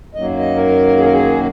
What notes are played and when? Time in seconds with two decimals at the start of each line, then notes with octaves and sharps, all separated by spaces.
0.15 F#2 D#3 F#3 A#3 D#5
0.38 D#5
0.56 A#4
0.97 G#4
1.05 A#4
1.13 G#4